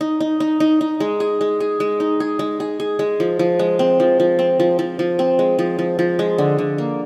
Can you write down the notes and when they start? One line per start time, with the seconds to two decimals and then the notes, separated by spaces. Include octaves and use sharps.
0.01 D#4
0.20 D#4
0.40 D#4
0.60 D#4
0.81 D#4
1.00 G#3
1.20 G#4
1.41 G#3
1.60 G#4
1.80 G#3
2.00 D#4
2.20 G#4
2.39 G#3
2.60 G#4
2.80 G#4
2.99 G#3
3.20 F3
3.39 F3
3.59 G#3
3.79 C4
4.00 F3
4.20 F3
4.39 C4
4.60 F3
4.79 F3
4.99 F3
5.19 C4
5.39 G#3
5.59 F3
5.79 F3
5.99 F3
6.19 G#3
6.38 D3
6.58 D3
6.78 A#3